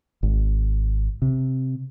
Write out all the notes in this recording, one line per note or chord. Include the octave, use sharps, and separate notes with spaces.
G#1
C3